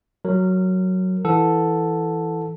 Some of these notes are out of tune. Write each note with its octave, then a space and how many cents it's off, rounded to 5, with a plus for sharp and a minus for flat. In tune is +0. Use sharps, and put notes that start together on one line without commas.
F#3 +5 A#4 -20
E3 +0 A4 +0 F#5 -25